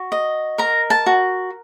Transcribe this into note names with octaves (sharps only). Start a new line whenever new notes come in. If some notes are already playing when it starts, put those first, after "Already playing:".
Already playing: F#4
D#5
A#4 A#5
A5
F#4